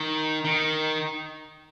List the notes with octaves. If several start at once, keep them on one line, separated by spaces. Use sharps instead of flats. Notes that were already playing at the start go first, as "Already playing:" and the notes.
Already playing: D#3
D#3